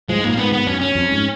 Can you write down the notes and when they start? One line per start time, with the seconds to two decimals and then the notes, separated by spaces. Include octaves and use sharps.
0.09 F3 G#3
0.19 G#2 A#3
0.29 A#2
0.37 G#2 B3
0.52 B3
0.67 F#2 C#4
0.81 C#4
0.95 F2
1.10 G#2